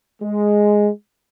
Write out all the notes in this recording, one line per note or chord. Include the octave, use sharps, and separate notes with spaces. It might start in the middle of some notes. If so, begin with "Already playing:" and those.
G#3